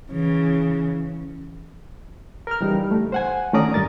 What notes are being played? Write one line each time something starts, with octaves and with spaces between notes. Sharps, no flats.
C#3 E3
A#4 F6
C#3 E3 G3 D#4
A3
C5 F#5 G#5
D#3 A3 C#4 D5 A#5 D#6
G2 A#4 A6